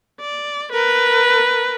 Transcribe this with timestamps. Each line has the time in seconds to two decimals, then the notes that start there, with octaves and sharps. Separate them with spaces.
0.20 D5
0.72 A#4 B4